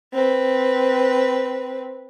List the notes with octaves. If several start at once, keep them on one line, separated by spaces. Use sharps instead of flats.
C4 B4